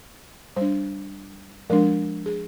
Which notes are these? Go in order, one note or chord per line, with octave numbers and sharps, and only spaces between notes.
G3 D4 C5
F3 G#3 D4 A#4
G#4